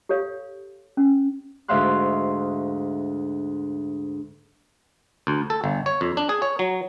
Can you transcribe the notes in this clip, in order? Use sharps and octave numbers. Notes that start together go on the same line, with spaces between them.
G4 A4 C#5 F5
C#4
D2 G#2 E5 F5 C6 F#6
D2
A4
G1
C#5
F2
D4
G#4
C#5
F#3